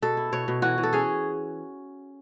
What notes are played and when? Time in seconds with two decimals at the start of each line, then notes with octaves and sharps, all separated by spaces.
0.02 B2 A4
0.17 E4
0.32 B2 C#5
0.48 B2
0.62 E3 F#4
0.78 E3
0.83 A4
0.93 C#4 G#4